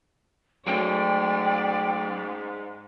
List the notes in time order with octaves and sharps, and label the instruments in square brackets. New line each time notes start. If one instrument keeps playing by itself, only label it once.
[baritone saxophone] G#2 [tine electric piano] F#3 A3 C#4 [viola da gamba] D5 [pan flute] G5